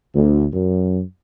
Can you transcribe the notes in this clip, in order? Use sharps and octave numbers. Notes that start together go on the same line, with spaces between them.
D2
F#2